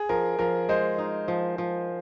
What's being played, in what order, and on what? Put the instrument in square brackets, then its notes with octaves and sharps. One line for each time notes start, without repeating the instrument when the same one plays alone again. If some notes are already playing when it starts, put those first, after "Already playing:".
Already playing: [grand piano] G#4
[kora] F3 [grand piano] A#4
[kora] F3 [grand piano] A#4
[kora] G#3 [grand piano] C5
[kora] D#4
F3
F3